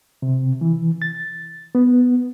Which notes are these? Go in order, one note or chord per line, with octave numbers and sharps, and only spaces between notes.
C3
E3
A6
B3